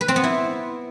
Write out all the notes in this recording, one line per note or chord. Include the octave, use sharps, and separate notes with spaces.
B4
C4
B3
E4